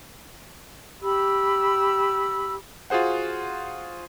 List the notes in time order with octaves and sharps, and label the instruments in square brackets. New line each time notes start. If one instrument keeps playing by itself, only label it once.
[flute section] G4 B5 E6
[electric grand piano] F4 F#4 G#4 C5 F#5